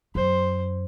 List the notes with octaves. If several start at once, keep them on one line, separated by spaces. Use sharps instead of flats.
F#2 C5